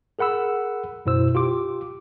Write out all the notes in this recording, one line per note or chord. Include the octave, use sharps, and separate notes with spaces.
G#4 A#4 F#5 B5 E6
F#2 B2 E4 C5 E6
F4 G4 C6 D6